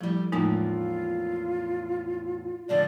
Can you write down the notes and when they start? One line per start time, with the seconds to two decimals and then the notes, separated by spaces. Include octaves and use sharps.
0.01 F3 G3 A3 E4
0.32 E2 A2 F3 G#3 A#3 D#4 F4
2.69 D3 F3 G#3 D5